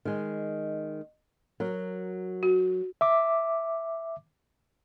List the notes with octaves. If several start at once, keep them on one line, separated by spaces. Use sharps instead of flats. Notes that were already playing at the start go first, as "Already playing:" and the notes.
D#3 G#3
F#3 A#4
F#4
E5 D6